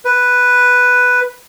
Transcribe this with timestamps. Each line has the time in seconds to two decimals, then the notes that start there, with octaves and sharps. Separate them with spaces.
0.05 B4